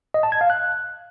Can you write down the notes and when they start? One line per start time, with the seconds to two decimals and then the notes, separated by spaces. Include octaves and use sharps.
0.14 D#5
0.23 A5
0.32 G#6
0.41 F5
0.50 F#6